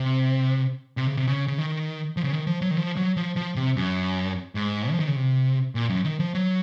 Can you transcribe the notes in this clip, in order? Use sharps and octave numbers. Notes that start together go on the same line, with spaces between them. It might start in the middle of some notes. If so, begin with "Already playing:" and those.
Already playing: C3
C3
C#3
C3
C#3
C#3
D#3
F3
C#3
D#3
F3
F#3
D#3
F3
F#3
F3
F3
C3
F#2
G#2
F3
D#3
C#3
C3
A#2
F#2
D#3
F3
F#3